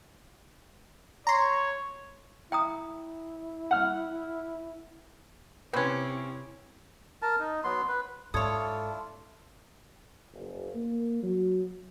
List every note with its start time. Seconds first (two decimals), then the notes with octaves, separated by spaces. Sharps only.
1.27 C#5 A#5 C6
2.52 E4 G5 A#5 D#6
3.71 F#5 F6
5.73 C3 C4 C#4 E4 B4 C5
7.22 A#4 A5
7.39 D#4
7.64 F#3 B3 C6
7.88 B4
8.34 G#2 D4 E4 F4 A4 C#5 D#6 G#6
10.33 F#1
10.75 A#3
11.23 F#3